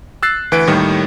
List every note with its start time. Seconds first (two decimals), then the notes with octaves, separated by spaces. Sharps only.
0.23 E6 F#6 A6 C7
0.52 D2 E3 B4 D7
0.67 D#2 A2 D#3 G3